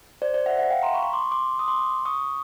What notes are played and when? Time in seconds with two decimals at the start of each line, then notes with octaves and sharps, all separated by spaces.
0.22 C5 D5
0.34 C5 D5
0.46 E5 F#5
0.58 E5 F#5
0.70 F5 G5
0.82 A#5 C6
0.94 B5 C#6
1.13 C6 D6
1.31 C6 D6
1.59 D#6
1.68 C6 D6
2.05 C#6 D#6